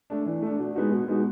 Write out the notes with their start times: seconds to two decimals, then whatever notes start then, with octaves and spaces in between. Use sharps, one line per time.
0.10 A3 D4
0.26 E3
0.42 A3 D4
0.59 B2
0.75 G#3 B3 D#4 F#4
0.92 B2
1.08 G#3 B3 D#4 F#4